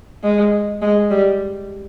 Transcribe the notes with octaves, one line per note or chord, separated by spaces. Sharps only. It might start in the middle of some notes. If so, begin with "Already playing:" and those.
G#3
G#3
G3